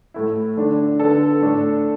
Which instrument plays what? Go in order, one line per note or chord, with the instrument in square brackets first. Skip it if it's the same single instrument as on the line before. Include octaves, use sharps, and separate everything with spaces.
[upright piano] A2 A3 E4
D3 A3 D4
D3 B3 D4 A4
A2 A3 D4